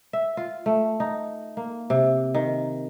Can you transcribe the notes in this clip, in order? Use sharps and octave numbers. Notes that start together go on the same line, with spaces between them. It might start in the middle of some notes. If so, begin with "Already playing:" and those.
E5
F4
A3
D#4
A#3
C3
D#3